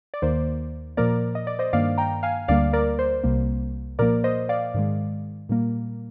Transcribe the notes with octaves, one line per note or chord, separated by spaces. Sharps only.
D5
D#2 D#3 A#3 C5
A#2 F3 A#3 A#4 D5
D#5
D5
C5 D#5
G2 D#3 A#3 D5 F5
G5 A#5
F5 G#5
D2 D3 G3 A#3 D5 F5
A#4 D5
C5
C2 C3 G3 A#3
A#2 F3 A#3 A#4 D5
C5 D#5
D5 F5
G#2 D#3 G#3
A#2 G3 A#3